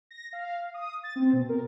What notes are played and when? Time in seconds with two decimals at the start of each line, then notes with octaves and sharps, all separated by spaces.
0.11 A#6
0.33 F5
0.74 D#6
1.03 A6
1.16 C4
1.33 B2
1.49 A#4